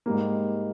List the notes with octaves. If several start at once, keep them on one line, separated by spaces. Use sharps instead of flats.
G#2 G3 A#3